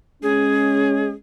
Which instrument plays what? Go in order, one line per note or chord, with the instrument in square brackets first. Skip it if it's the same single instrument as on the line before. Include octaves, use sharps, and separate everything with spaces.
[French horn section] G#3 C#4 [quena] G#4